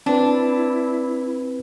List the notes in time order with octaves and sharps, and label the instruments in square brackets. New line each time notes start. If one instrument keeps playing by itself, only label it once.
[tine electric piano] C4 B4 [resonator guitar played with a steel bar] D4 [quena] E4